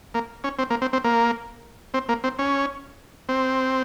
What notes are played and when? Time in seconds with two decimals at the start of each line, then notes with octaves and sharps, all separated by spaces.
0.14 A#3
0.44 C#4
0.59 C4
0.70 A#3
0.82 C4
0.93 C4
1.04 A#3
1.94 C4
2.09 A#3
2.24 C4
2.39 C#4
3.29 C4